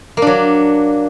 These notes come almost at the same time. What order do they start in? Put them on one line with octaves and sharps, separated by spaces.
A#3 D4 F#3